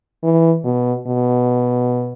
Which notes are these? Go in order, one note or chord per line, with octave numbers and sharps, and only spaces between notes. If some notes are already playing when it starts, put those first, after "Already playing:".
E3
B2
B2